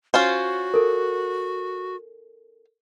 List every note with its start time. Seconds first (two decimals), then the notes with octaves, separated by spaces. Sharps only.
0.14 C#4 F4 F#4 C5
0.74 A4 A#4